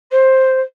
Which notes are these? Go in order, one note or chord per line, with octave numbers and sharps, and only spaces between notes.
C5